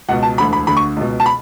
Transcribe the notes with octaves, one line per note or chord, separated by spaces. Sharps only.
C#2 B2 F#5
A5
E1 D2 D3 B5
B5
D2 D3 B5
C#6
C#2 B2
A5
B5